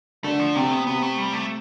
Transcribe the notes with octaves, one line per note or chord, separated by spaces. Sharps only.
D3 A3
F3
C3 A3
B3
C3 B3
A3
G3
A3